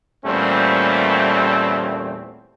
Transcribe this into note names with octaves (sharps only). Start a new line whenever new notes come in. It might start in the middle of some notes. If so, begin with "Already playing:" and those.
E2 A#2 G3 A3 C4 C#4